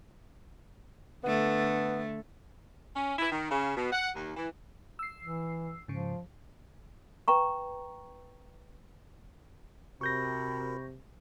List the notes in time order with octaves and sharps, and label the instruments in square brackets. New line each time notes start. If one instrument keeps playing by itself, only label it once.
[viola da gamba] D3 A3 [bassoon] B3
[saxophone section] C#4
E4
D#3
C#3
B2
F#5
D#2
E3
[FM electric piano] E6 C7
[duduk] E3
[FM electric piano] G#2 C#3 [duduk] F3
[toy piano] B4 G5 A#5 C#6
[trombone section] C3 [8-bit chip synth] F#4 A#4 [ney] B5 [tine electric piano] C#6 G6 A#6